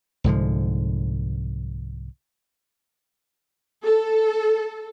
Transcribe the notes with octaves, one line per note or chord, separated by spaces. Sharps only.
C2 G#2 D3 F3
A4